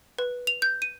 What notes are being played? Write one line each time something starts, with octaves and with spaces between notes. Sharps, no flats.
B4
F7
G6
D#7